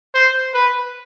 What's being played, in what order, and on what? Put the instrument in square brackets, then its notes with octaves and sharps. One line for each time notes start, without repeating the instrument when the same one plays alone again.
[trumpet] C5
B4